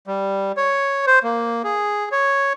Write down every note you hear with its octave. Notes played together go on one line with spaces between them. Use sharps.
G3
C#5
C5
A#3
G#4
C#5